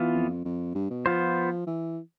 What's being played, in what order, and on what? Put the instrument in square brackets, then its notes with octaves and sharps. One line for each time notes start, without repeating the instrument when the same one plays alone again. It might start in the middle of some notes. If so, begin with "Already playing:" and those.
Already playing: [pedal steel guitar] E3 B3 F4
[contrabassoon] F2
F2
G2
B2
[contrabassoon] F3 [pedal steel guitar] B3 F4 C5
[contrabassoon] E3